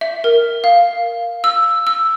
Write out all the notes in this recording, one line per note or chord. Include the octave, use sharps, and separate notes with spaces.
E5
A#4
F5
E6
E6